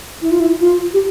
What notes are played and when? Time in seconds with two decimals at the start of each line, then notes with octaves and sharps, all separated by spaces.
0.22 E4
0.31 F4
0.40 E4
0.60 F4
0.94 G4